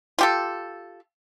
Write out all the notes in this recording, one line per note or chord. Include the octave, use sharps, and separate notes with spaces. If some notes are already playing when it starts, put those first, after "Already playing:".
F4 G4 A4